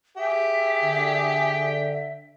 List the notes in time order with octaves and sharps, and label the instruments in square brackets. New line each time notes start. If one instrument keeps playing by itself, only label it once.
[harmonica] G4 G#4 G5 [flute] E5
[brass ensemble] D3